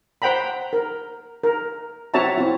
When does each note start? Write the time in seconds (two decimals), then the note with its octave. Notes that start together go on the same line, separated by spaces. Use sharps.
0.22 C5 F#5 G5 A#5 B5
0.73 A#4
1.44 A#4
2.14 C4 F#4 C#5 E5 A5 A#5
2.38 C4 E4 F4